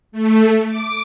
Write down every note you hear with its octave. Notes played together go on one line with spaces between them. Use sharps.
A3
D6